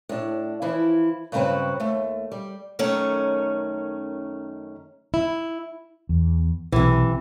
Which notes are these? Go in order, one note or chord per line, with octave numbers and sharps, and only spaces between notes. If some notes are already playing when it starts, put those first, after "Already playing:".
A2 D4
E3 F3 E4
G2 C#3 F#3 C4 B4 F#5
D#2 A3
G3
F#2 D#3 A3 C#4 C#5
E4
E2
B1 C3 E3